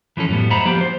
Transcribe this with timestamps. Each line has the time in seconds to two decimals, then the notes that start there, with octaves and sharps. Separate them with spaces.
0.17 E3 F3 C#4 A4
0.29 F#2 A2 G3 B3
0.50 C5 D#5 E5 F#5 A#5 B5
0.65 F3 G3 A#3 B3 D4 G4
0.81 C5